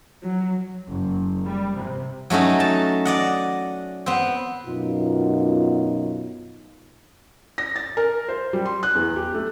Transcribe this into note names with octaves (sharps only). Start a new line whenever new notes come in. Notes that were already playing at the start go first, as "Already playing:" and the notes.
F#3
F#1
G3
C3
F#3 A3 C#4 D#4 A#5
A5
D5 D#5 F#5
B3 C4
F#2 B2 D#4 F4
A#6
A6
A#4
C5
G3
C6
F#6
E2
G4
A3